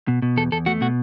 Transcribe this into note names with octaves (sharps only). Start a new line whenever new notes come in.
B2
B2
E2 A4
E2 A4
A3 F#4
B2 F#4